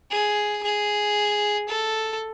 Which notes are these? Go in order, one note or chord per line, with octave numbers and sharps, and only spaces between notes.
G#4
G#4
A4